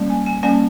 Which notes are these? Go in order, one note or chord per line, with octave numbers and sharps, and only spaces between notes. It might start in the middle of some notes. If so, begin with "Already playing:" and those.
Already playing: G3 A#3 C#4
G#5
G#5
G3 A#3 C#4 G#5